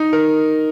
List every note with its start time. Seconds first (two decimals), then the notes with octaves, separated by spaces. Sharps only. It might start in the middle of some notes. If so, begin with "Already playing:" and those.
Already playing: D#4
0.13 A#4